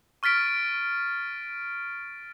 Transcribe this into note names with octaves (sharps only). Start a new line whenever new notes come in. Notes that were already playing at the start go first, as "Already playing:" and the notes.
C#6 F6 A6 B6 D7